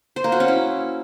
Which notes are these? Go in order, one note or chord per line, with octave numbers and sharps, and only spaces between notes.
C5
A#3
F#4
C#4
E4